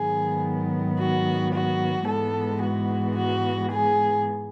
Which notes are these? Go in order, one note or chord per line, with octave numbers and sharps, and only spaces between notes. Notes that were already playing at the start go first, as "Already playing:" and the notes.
Already playing: G#2 D#3 F#3 B3 G#4
F#4
F#4
G#2 E3 G#3 B3 A4
F#4
F#4
G#4